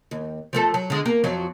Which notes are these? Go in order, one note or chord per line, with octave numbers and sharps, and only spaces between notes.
D#2
F3 A3 A4
F#3
D3 G#3
A#3
F2 F#3 F4